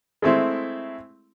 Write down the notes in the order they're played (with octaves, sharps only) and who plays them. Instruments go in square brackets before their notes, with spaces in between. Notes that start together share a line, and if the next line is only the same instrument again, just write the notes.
[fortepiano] G#3 A3 C4 E4